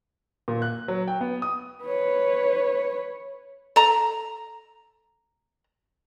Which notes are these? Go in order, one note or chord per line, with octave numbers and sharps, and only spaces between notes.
A#2
F#6
F#3
G5
B3
D#6
B4 C#5
A4 A#5